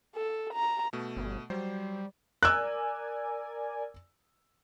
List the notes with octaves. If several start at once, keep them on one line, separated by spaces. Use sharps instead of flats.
A4
A#5
B2 A3
G1
F#3 G3 C5
A#4 D5 G#5 E6 F#6